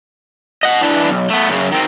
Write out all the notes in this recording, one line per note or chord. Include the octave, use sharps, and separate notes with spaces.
D#5 F#5
E3 D4
B1
A3 B3
F#2 C#3
D#3 C4